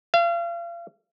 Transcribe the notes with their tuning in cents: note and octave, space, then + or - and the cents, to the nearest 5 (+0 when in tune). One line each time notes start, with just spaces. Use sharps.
F5 -35